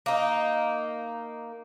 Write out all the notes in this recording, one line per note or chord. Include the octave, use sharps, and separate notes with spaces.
A#3 D#4